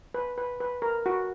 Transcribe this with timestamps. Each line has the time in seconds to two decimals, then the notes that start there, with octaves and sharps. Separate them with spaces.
0.14 B4
0.38 B4
0.60 B4
0.82 A#4
1.06 F#4